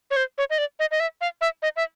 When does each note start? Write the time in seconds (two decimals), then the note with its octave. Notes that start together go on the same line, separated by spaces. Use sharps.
0.11 C#5
0.16 C5
0.38 C#5
0.50 D#5
0.58 D5
0.79 D#5
0.91 D#5
1.00 E5
1.21 F5
1.41 E5
1.62 D#5
1.76 E5